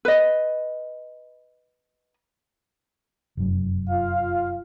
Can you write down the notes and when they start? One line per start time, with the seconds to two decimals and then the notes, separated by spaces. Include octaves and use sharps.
0.05 B4 D#5
3.37 F1 F#2
3.90 F4 F5